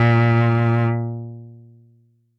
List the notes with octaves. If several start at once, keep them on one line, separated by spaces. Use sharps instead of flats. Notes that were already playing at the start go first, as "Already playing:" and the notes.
Already playing: A#2